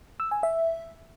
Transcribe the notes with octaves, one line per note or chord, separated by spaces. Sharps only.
E6
G#5
E5